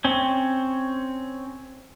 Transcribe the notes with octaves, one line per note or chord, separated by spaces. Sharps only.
C4 C#4